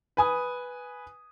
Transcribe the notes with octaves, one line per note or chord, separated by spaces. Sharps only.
B4 G#5 D#6